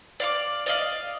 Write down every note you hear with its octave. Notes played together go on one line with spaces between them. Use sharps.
D5 F5 D6
D5 D#5 F5